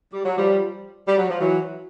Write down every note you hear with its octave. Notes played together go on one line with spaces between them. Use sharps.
G3
F#3
F3 G3
G3
F#3
F3
E3 F#3